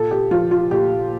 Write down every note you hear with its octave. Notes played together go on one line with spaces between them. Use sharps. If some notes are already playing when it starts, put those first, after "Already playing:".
Already playing: A#2 A4
G4
F3 F4
F4
A#2 G4